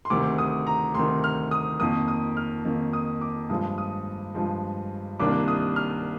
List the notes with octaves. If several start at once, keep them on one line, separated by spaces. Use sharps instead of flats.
C6
D2 C3 D#3 D6
D#6
A#5
D2 C3 D#3 C6
F6
D#6
F2 D#3 A#3 D#6
D#6
F6
F2 D#3 A#3
D#6
D6
G2 F3 G#3 D#6
D#6
G2 F3 G#3
C2 C3 D#3 A#3 D4 D6
D#6
F6